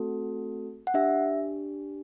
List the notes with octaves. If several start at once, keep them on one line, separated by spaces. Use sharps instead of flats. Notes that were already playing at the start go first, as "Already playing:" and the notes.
Already playing: A3 C4 F#4 A4
F#5
D4 G4 E5